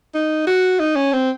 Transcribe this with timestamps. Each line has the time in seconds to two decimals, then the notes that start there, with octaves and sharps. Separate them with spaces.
0.15 D#4
0.47 F#4
0.79 D#4
0.96 C#4
1.13 C4